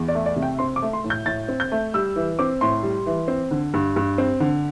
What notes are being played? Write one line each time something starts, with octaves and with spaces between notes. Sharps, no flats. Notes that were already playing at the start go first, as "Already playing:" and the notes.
Already playing: E2
D5
A3
D5
C3
G5
C4 C6
D6
A3
C6
A2
G6
A2 A6
C4
G6
A3
G3 E6
E3
C4 D6
A2 C6
G3
E3
C4
D3
G2
G2
C4
D3